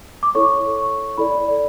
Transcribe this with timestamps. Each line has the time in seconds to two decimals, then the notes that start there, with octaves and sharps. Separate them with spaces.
0.23 D6
0.35 E4 A4 C#5 C#6
0.76 C#6
1.18 E4 A4 D5 B5
1.38 D5
1.48 D5